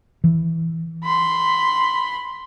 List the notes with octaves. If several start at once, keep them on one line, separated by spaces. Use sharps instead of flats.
E3
B5 C6